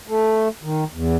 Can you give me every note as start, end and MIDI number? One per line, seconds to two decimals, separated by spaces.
0.08 0.48 57
0.63 0.84 51
0.94 1.16 40